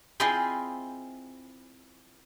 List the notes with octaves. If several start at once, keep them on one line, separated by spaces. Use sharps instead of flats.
C4 E4 F4 G#4 D#5 G#5